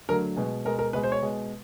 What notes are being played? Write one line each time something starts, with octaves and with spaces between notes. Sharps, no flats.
D3 F#3 A3 A#4
B2 G#3
B2 G#3 A#4
A#4
B2 G#3 B4
C5
C#5
B2 G#3